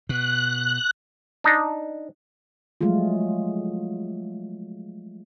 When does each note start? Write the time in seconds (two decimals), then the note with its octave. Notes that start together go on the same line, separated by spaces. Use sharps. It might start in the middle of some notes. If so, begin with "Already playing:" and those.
0.09 B2 F#6
1.44 D4 D#4
2.81 F3 F#3 G#3 A3 F4